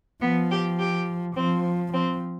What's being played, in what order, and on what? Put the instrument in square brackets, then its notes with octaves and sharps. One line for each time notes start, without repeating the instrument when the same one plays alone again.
[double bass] F3 [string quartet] B3
[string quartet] G4
G4
[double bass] F3 [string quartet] C4
[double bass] F3 [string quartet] C4